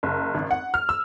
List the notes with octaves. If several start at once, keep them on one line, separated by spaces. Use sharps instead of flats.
F#1
G#1
F#5
F6
E6